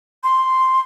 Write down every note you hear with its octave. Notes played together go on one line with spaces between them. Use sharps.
C6